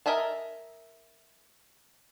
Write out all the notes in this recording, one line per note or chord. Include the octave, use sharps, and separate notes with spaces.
A#4 D#5 E5 G#5 A5